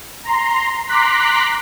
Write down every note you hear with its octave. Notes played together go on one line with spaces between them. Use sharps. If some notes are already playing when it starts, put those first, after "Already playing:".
A#5 C6
A#5 C6 D6 F#6 B6